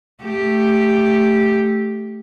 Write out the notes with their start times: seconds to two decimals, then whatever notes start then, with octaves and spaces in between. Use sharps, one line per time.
0.23 A3 G4